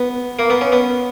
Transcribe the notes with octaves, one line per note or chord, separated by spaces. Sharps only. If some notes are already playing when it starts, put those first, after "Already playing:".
Already playing: B3
A#3
B3
C#4
B3